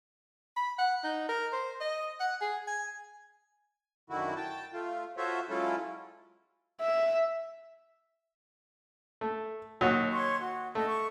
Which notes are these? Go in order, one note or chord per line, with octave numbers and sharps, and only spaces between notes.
B5
F#5
D#4
A#4
C5
D#5
F#5
G#4
G#5
F#2 D3 D#3 E4 F#4
G5 A5
A3 F4
F4 F#4 A4 C5 C#5 E5
F#3 G#3 C#4 E4 F4 A4
E5
A3
D#2 F#3
C#5 C6 C#6
F#4
A3 D#5
C#6